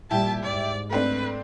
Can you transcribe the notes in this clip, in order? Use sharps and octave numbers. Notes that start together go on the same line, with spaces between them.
A#2 G3 E4 G4 A5
G#2 D5
A3 C4 D4 B4